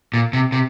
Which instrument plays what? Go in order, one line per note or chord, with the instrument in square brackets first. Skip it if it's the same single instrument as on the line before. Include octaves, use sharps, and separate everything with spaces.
[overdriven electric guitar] A#2
C3
C3